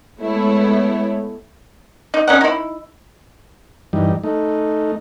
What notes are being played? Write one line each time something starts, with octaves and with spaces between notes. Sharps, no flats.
G#3 A3 B3 E4 C#5
D#4
C#4 D#4 F#5
D#4 E4
G2 E3 G3 D#4
A3 D#4